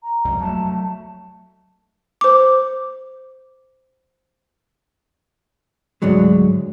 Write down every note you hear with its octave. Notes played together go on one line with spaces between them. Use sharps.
A#5
C2 F2 G3
F#3 G#3 A3 A5
C5 D6
D2 G#2 D3 F#3 G#3